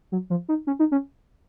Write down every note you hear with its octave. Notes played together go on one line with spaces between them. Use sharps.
F#3
F3
D#4
C#4
D#4
C#4